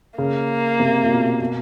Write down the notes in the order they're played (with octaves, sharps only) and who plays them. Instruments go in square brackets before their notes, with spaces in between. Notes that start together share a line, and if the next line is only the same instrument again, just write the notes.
[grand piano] C#3 [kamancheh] A#3
[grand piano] C3
A#2
B2
B2